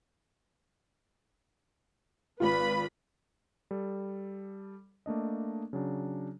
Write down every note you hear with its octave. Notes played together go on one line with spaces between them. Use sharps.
G#1 F4 B4 B5
G3 A4
A3 A#3 D4 D#5
C#3 F#3 D4